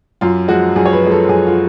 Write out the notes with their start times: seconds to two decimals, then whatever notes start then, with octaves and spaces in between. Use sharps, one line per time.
0.21 F#2 F4
0.48 F3 G#3 F#4
0.76 F#2 G#4
0.85 C#5
0.93 B4
1.02 F3 G#3
1.11 A4
1.29 F#2 G#4
1.47 F4